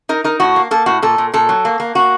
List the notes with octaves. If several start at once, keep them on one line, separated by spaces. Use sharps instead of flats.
D#4 A#4
D#4 A#4
A2 F#4
A#3
A#3 A4
A2 F#4
A#2 A4
A#2
A#2 A4
F#3
A#3
A#3
A#3 F#4